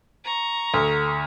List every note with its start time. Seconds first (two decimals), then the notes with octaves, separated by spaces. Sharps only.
0.24 A#5 C#6
0.74 D2